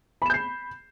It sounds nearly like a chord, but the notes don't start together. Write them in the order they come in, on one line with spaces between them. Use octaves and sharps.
B5 E7 G6 C7